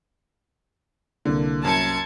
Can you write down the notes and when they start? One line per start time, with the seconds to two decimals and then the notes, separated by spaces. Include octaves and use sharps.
1.25 C2 D3 A#3
1.65 F#2 A5 G#6 C#7